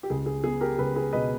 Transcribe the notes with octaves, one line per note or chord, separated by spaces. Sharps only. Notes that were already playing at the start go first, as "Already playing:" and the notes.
G4
C#2 G#4
G#4
B3 G#4
G4 A#4
C#2 G#4 B4
G#4 B4
B2 B4 D#5